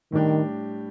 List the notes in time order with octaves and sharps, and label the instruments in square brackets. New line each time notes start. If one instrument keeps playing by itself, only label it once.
[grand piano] A2 G3 D4 G4 [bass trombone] D#3